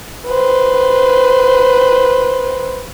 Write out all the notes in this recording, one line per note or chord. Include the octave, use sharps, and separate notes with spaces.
B4 C5